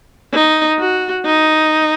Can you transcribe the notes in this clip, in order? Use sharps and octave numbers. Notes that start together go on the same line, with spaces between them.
D#4
F#4
D#4